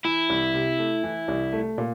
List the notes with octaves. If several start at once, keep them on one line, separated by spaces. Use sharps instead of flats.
E3 E4
C2
C3
A3
E3
C2
A3
A#2